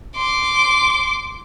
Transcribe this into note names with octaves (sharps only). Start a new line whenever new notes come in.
C6 D6